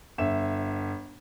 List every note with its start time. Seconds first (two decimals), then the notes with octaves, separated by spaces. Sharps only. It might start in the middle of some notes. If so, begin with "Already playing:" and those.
0.18 G1 E5 E7